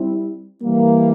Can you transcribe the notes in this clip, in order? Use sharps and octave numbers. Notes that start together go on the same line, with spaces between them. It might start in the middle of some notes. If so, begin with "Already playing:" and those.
Already playing: G3 C4 E4
E3 G3 A#3